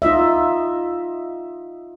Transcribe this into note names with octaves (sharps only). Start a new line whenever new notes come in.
D#4 F4 D#5 E5